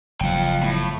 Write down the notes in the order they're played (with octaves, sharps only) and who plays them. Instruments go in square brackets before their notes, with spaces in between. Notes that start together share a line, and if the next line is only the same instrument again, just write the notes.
[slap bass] F#1 F3 [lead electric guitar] F5 G5
[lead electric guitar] A2